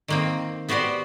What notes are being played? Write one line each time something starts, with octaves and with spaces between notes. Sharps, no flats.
D#3 A#3 C4
B3 F#4 G4 C5 D5